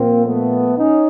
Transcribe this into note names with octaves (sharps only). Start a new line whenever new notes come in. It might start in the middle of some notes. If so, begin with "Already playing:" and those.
Already playing: A#2 F3 A#3 C4
A3 B3
C#4 D#4